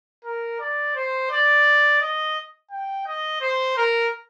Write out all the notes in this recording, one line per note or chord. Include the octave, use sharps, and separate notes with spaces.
A#4
D5
C5
D5
D#5
G5
D#5
C5
A#4